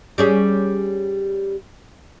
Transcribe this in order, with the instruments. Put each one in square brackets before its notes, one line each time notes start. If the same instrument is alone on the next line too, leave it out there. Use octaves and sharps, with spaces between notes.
[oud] G3 C#4 G#4